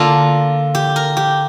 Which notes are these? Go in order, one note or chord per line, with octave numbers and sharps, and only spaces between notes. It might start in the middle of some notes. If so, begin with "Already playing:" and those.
Already playing: D3 A#3 D4 F4
G4
A#4
G4